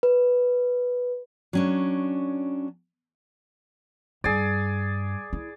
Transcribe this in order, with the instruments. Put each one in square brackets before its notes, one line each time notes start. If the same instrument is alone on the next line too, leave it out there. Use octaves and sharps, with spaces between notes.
[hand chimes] B4
[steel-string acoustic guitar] F#3 C#4 D4
[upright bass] G2 [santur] G#4 D5
[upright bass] E4